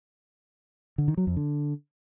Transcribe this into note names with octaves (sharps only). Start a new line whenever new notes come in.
D3
D#3
F#3
F2
D3